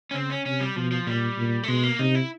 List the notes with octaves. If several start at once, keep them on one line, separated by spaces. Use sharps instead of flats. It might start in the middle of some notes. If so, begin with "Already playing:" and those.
C#4
C#3 C4
C#4
C3 C#4
G3
B2 F3
F3
A#2 G3
A#2
A3
B2 G#3
A#3
C3 D#4
E4